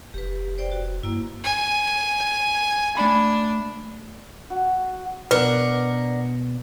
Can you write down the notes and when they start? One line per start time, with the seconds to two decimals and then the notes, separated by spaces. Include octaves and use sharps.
0.14 F1 G4 B4
0.58 C5 D5 G5
0.71 F#4
1.03 G2 A#3 E4
1.44 G#5
2.97 A3 D4 B5
4.50 F#4
5.31 B2 D4 A#4 B4 F#5